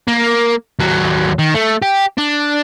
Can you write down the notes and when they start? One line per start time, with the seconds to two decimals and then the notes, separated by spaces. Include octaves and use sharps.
0.08 A#3
0.79 D#2 F#3
1.39 D#3
1.54 A3
1.82 G4
2.18 D4